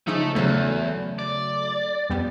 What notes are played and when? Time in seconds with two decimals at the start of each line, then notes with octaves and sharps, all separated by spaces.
0.07 C#3 F3 A3 D#4
0.35 E2 C#3 F#3 A3
1.19 D5
2.10 F2 G3 B3